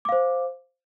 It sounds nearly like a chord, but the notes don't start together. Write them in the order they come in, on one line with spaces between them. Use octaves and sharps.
D6 F5 C5